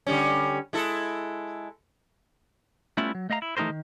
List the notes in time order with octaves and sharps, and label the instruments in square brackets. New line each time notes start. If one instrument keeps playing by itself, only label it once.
[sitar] D3 G3 C#4
G#3 E4 A4
[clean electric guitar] G3 A3 B3 C#4 E4 F4
F#3
A3 D#5 F5 A#5
E4
E3 A3 D#4 G4 A#4 C5
D#3